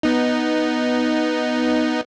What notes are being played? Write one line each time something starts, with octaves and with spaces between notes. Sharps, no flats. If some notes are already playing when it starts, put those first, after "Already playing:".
B3 D#4